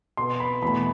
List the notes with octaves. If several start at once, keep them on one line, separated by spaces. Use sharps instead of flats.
B2 B3 C6
B5
E2 B2 A3 B5